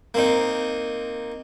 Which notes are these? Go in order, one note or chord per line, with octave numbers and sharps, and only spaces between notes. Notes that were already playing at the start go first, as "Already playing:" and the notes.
A#3 C4 D#4